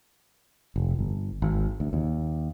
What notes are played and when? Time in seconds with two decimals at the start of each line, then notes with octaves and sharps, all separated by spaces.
0.76 F1
0.99 G1
1.42 G#1
1.80 D2
1.93 D#2